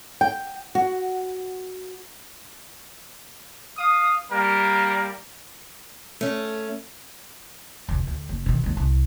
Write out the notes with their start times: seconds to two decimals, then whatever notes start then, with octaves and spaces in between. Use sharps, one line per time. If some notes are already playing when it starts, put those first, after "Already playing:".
0.21 G5
0.75 F#4
3.77 F5 D#6
4.30 G3 A#3 A#4
6.21 A3 C#4
7.89 F1 D2
8.07 D2
8.29 F#1
8.46 B2 D#3
8.64 D#2 G#3
8.77 C2